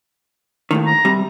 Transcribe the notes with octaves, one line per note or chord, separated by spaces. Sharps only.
D#2 A2 D#3
A#5
C3 G3